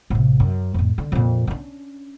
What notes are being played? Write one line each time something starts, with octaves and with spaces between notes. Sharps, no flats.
A1 C3
F#2
F2 A2
D3
F2 A#2
C#4 D4